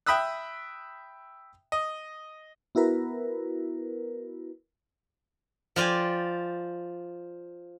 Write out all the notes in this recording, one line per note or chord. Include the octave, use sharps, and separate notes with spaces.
E5 G5 B5 D#6 E6 F#6
D#5
B3 E4 F#4 A#4 B4
F3 F4 D5 G5 G#5